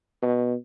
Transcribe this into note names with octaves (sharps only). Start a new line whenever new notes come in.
B2